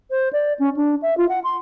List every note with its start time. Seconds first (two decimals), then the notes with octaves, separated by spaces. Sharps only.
0.10 C5
0.33 D5
0.59 C#4
0.76 D4
1.02 E5
1.17 F4
1.29 F#5
1.44 C6